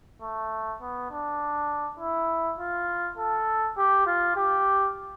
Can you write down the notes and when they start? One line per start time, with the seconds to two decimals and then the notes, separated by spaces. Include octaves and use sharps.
0.22 A3
0.81 B3
1.11 D4
2.00 E4
2.59 F4
3.18 A4
3.77 G4
4.06 F4
4.36 G4